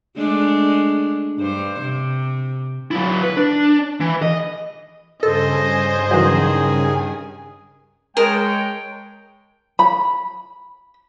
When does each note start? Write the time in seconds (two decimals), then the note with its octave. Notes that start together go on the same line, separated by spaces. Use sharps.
0.17 G#3 A3 D4
1.38 G2 C5
1.80 C3
2.91 F#3 E4
3.22 B4
3.37 D4
4.01 E3
4.22 D#5
5.23 G2 C#3 A4 C5 D#5 G#5
6.11 D#3 E3 F#3 G#4
8.17 G#3 G#4 A#4 C#5 G5 A5
9.79 B5